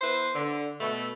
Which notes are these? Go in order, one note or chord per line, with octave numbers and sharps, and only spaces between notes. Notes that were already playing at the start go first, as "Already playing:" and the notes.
B3 E4 B4 C5
D3
B2 A3